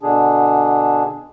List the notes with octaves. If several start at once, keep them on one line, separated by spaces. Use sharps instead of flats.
B2 D3 D4 G#4